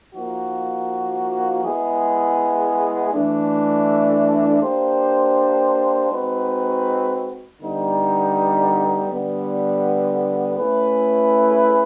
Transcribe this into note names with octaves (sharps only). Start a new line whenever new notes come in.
F3 A#3 D#4 F#4
G#3 B3 E4 G#4
E3 A3 D4
A#3 D4 G4 C5
G#3 C4 D#4 F#4 B4
D3 G3 B3 D#4
D3 G3 B3
A3 C#4 E4 G#4 B4